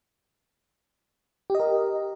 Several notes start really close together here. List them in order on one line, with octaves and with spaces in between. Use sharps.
G4 D#5 A#4